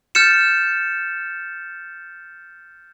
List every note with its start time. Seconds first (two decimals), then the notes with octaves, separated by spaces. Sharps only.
0.15 F6 G6 A6 C#7 E7